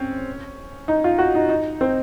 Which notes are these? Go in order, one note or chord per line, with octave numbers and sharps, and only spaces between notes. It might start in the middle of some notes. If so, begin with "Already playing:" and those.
Already playing: C4 C#4
D#4
F4
F#4
D#4
D#4
C4